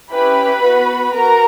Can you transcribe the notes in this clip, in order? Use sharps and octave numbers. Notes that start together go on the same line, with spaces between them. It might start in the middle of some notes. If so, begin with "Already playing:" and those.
C#4 E4 G4 B4 B5
B3 F#4
B3 F#4 A#4 A#5